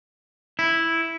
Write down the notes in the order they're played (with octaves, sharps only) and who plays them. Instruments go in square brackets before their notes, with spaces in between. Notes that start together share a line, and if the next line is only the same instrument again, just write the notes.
[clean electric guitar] E4